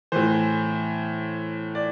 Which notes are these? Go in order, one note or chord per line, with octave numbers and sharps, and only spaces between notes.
A2 E3 C5
D5